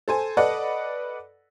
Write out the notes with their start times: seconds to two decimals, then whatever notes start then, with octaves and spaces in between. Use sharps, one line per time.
0.08 A4 C5 G#5
0.37 A4 B4 D5 D#5 F#5